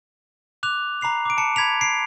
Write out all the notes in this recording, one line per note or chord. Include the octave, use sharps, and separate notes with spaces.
D6 F#6 F7
A#5 B5 C7 F7
D6 D7
A5 C#7
B5 G#6 B6 F7
G#6 C7 D7